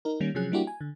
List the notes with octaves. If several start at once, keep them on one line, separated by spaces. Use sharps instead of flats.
D#4 A#4
D#3 G3 A#3 C#4
C3 F3 F#3 C#4 G#4 F#6
G3 A#3 D4 E4 F#4 G4
G#5
D3